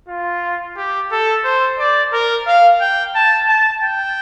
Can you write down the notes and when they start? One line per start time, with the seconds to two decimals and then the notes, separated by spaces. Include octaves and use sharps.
0.09 F4
0.77 G4
1.11 A4
1.45 C5
1.79 D5
2.13 A#4
2.47 F5
2.81 G5
3.15 A5
3.48 A5
3.83 G5